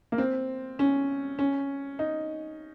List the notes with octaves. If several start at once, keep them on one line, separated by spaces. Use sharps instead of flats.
A#3
C4
C#4
C#4
D#4